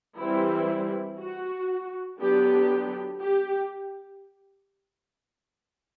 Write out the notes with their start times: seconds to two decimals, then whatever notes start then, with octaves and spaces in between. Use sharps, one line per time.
0.18 E3 G3 C4 E4
1.19 F#4
2.20 D3 F#3 B3 D4 G4
3.21 G4